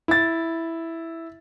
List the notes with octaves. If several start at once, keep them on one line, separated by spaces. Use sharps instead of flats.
E4 A6